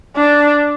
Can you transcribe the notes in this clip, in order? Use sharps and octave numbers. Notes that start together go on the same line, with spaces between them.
D4